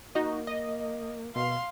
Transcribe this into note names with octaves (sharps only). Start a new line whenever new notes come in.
A#3 D#4 F#4 D#5
D#5
B2 F5 C6